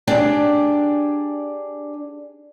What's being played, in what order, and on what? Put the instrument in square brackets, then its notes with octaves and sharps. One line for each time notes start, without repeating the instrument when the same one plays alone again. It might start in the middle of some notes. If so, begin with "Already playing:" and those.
[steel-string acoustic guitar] D4 G4 G#4 D5 G5